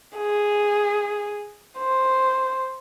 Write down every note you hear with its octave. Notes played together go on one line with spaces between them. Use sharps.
G#4
C5